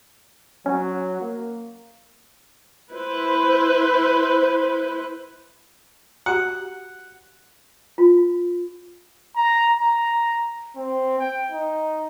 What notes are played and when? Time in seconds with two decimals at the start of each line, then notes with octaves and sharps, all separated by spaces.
0.66 F#3 C#4
1.21 A#3
2.94 E4 B4 C5
6.26 F#4 G4 F#5
7.98 F4
9.36 A#5
9.78 A#5
10.76 C4
11.19 G5
11.52 D#4